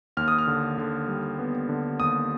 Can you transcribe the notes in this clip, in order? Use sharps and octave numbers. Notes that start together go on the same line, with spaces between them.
D#2 F6
D#6
F6
D3
D3
G3
B3
D3
D#2 D#6